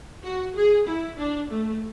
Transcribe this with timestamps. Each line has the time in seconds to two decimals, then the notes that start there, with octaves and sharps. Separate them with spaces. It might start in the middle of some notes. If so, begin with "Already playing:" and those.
0.23 F#4
0.55 G#4
0.87 E4
1.18 D4
1.49 A3